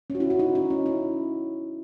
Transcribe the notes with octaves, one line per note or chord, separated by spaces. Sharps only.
C#4
F#4
E4
F#4
D#4
D#4
C#4
E4